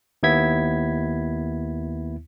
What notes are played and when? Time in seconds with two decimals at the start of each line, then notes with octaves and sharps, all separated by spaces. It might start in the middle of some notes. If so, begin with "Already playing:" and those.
0.23 D#2 B3 E4 G#6 B6